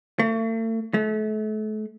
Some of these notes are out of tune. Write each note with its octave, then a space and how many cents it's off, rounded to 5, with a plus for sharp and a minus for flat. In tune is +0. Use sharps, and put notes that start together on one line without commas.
A3 +40
A3 -35